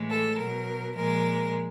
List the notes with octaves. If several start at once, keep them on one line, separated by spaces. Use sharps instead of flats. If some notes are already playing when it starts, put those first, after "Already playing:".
Already playing: A2 E3 G#3
A4
B2 F#3 A#4
A#2 F3 G#3 A#4